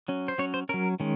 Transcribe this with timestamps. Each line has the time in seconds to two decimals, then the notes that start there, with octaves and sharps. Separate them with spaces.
0.08 F#3 C#4
0.28 C5
0.38 F#3 C#4 C#5
0.54 C5
0.69 F#3 C#4 A#4
1.00 D#3 G#3 C#4